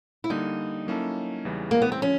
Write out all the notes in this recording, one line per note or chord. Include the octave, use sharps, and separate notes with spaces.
E4
D3 G3 A#3 D#4
F#3 A#3 C#4 E4 A4
E2 C#3 E3 G3
A#3
B3
C4
D3 F3 C#4